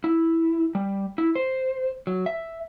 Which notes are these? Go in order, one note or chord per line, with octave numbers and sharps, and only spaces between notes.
E4
G3
E4
C5
F#3
E5